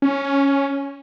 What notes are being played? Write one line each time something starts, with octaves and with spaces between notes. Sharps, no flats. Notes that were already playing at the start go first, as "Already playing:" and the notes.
C#4